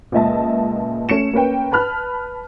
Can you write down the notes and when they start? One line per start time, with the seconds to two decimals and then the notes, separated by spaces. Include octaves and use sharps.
0.12 C#2 A#2 D#5 E5 A5
1.09 A3 C#4 C#7 E7
1.33 A#3 C#4 B4 G5
1.72 B4 A5 B5 F6 F#6